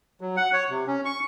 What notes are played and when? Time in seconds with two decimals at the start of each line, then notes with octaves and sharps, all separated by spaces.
0.21 F#3
0.37 F#5
0.53 C#5
0.70 C3
0.87 C#4
1.05 C#6